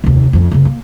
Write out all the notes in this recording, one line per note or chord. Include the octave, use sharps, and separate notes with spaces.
F1 D#2
F2 C#4
F#1 C#3
A#3